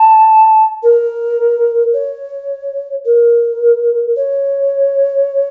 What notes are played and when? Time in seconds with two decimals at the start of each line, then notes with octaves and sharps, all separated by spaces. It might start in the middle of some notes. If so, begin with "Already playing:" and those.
Already playing: A5
0.83 A#4
1.94 C#5
3.05 A#4
4.16 C#5